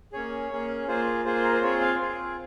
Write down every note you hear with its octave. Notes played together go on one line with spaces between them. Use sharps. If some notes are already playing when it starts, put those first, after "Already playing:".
A#3 C#4 G#4 C#5
A#3 C#4 G#4
A#3 F4 G#4 C5
A#3 F4 G#4 C5
A#4
C5
C4 F4 G#4 C#5
F5
C4 F4 G#4